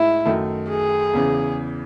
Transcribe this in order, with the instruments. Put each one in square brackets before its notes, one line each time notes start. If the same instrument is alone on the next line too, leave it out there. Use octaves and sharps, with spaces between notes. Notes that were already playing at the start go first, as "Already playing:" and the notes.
Already playing: [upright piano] A2 G#3 D#4 [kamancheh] E4
[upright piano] F#2 D#3 A3
[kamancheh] G#4
[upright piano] E2 C#3 E3